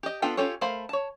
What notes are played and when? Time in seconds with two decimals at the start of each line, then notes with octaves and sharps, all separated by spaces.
0.03 G4 D#5
0.22 B3 D4 F4 A4 G5
0.37 C#4 F4 G4 A4 C#5
0.61 A3 A#4 C5 F5 B5
0.89 C#5 A5